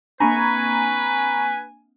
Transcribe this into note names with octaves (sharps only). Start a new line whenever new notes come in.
A#3 C4 D4 B4 G#5 A#5 B5 C#6